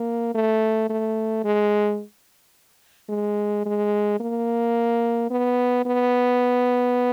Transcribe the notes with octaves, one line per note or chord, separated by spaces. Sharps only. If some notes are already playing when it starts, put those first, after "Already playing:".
Already playing: A#3
A3
A3
G#3
G#3
G#3
A#3
B3
B3